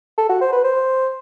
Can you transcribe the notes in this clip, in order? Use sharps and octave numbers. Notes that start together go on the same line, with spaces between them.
A4
F#4
C5
B4
C5